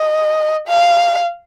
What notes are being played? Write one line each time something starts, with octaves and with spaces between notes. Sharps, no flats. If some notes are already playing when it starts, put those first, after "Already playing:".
Already playing: D#5
F5